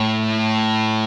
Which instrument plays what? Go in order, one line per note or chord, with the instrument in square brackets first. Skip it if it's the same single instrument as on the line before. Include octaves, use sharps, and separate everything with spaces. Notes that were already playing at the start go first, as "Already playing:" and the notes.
Already playing: [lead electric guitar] A2